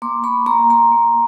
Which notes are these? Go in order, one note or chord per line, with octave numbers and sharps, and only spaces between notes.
A#3 C6 D6
A#3 B5 C#6
A#3 A#5 C6
A#3 A#5 C6
A#3